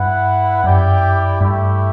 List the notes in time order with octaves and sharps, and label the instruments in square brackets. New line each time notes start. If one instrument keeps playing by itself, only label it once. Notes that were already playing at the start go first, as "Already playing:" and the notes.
Already playing: [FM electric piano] G2 [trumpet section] E4 B4 F#5
[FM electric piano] F#2 [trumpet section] E4 G4 D5 G5
[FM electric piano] G2 [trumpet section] A3 E4 G4